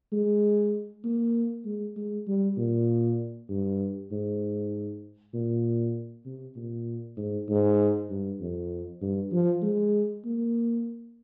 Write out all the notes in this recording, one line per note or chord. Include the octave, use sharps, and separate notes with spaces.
G#3
A#3
G#3
G#3
G3
A#2
G2
G#2
A#2
C3
A#2
G#2
G#2
G2
F2
G2
F3
G#3
A#3